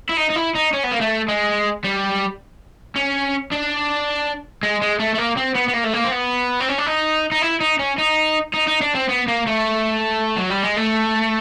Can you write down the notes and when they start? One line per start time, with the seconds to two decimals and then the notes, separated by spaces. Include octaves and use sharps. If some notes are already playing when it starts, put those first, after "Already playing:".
0.09 E4
0.17 D#4
0.30 D#4
0.35 E4
0.55 D#4
0.73 C#4
0.83 B3
0.91 A#3
1.01 A3
1.28 G#3
1.85 G3
2.96 C#4
3.51 D4
4.63 G#3
4.82 G#3
5.00 A3
5.15 A3
5.18 A#3
5.37 C4
5.56 B3
5.69 B3
5.74 A#3
5.85 A3
5.94 A#3
6.04 C4
6.12 B3
6.60 C4
6.69 C#4
6.78 D4
6.86 D#4
7.32 D#4
7.42 E4
7.61 D#4
7.79 C#4
7.98 D#4
8.54 D#4
8.67 D#4
8.81 D4
8.95 C4
9.09 B3
9.28 A#3
9.47 A3
10.37 F#3
10.50 G3
10.63 G#3
10.77 A3